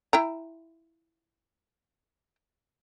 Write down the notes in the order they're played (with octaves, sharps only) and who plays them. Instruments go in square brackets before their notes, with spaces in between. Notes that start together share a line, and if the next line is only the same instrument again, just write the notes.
[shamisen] E4 G5 A#5